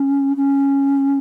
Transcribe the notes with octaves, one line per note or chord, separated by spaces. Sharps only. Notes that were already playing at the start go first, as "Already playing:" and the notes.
Already playing: C#4
C#4